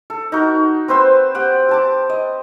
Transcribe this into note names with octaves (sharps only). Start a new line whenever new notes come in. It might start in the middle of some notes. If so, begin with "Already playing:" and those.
A4
D#4 F#4 A#4
C4 B4 C5 E6
G4 F#5 G5
G4 A5 D6
D#5